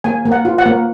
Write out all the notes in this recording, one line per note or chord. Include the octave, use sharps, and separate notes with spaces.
A#3 G#5
A#3
F#5
F4
F#5
A#3